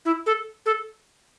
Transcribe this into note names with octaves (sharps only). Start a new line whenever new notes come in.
E4
A4
A4